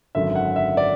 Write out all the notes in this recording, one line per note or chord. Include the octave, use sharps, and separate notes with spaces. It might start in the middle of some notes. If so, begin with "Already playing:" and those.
G#1 F#2 D3 F#3 E5
F#5
E5
D5